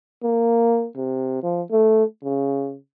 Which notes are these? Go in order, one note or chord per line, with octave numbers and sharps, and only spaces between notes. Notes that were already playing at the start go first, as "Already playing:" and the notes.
A#3
C3
F3
A3
C#3